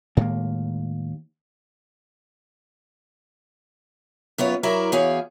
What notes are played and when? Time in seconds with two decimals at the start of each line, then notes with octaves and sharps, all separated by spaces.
0.17 D#2 A2 G#3 A#3
4.38 F#2 B3 F4 C#5
4.63 F#3 E4 A#4 D5
4.92 E2 F#4 G#4 C#5 F5